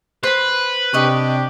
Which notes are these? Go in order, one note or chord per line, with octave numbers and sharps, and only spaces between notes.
B4 C5 C6
C3 D4 G4 D#5 C#6